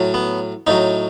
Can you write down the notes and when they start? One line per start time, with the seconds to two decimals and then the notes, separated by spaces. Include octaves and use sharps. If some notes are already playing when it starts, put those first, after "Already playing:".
Already playing: A2 F#3
0.14 B3
0.67 A2 F#3 D#4